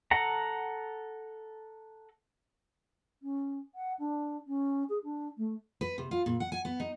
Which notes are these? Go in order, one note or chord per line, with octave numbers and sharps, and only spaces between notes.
A4 F#5 A#5
C#4
F#5
D4
C#4
G#4
D4
A3
B4
C3
F4
A#2
F#5
G#5
B3
D#4